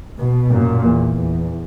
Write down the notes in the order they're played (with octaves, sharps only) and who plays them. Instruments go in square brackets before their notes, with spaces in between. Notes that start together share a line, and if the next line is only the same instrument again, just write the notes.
[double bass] B2
[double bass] F#2 [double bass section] A#2
[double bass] E2
E2